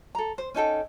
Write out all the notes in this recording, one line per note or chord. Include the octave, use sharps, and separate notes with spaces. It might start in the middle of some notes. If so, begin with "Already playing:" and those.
A4 A#5
C5
C#4 D#4 A4 G5